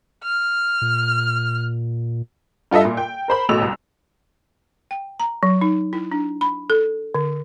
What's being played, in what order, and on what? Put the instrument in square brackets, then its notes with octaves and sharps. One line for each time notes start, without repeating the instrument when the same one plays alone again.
[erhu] F6
[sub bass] A#2
[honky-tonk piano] G2 F4 A4 D#5 E5
A#2
G5
A#4 C5 B5
A1 B2 A3 E6 F7
C2
[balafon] G5
A#5
F#3
D#4
E4
D4
B5
A4
D3